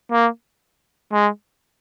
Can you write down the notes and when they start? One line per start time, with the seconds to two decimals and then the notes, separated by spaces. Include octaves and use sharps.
0.12 A#3
1.13 G#3